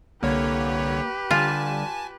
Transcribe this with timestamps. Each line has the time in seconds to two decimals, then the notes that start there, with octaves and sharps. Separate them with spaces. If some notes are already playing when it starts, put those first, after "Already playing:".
0.23 C2 D3 A#3 G4 B4 C#5
1.31 D3 G3 F4 G#5 A5